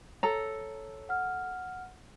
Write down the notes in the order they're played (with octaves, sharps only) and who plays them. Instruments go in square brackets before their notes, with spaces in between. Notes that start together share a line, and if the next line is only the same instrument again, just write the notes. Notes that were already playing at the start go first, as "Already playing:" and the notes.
[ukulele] A4 A#5 [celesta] C#5
[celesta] F#5 F6